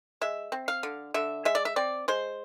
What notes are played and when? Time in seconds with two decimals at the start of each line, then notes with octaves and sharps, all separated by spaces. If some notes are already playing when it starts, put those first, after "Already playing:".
0.21 G#3 E5
0.52 C4
0.68 F5
0.83 D3
1.14 D3 E5
1.45 G#3 E5
1.55 D5
1.65 E5
1.76 C4 D5
2.08 G#3 C5